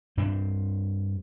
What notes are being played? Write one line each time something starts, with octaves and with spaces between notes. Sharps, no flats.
G2 C4 D4